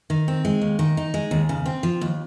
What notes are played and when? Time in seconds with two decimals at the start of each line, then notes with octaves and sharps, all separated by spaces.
0.10 D#3
0.28 C4
0.45 G#3
0.61 D#2
0.79 D#3
0.97 D#4
1.14 G#3
1.31 D#2
1.49 C#3
1.66 C4
1.83 F3
2.01 D#2